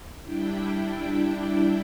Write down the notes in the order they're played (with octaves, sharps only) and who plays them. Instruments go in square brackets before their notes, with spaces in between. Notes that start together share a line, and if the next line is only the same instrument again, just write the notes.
[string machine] G3 D4 E4 G5